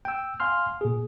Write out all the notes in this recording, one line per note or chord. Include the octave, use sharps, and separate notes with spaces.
G5 E6
F5 F#5 G#5 C6 F6
A#2 G#4